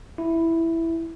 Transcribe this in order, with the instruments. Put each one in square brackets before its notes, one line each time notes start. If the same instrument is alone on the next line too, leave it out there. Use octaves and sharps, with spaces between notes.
[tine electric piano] E4